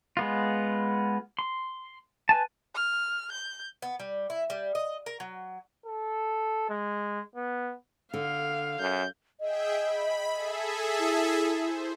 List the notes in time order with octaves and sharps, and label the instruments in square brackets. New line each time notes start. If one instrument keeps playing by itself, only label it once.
[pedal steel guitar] G#3 B3 F4
C6
B4 G#5 A5
[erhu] F6
G6
[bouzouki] B3
G3
E4
G3
D#5
A#4
F#3
[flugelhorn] A4
G#3
B3
[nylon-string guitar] D3 [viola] F5
[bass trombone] F#2 [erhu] G6
[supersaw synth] G#4 E5 G5 [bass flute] D#5
[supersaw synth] B5
G#4 A4 E5
[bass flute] E4
[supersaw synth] C5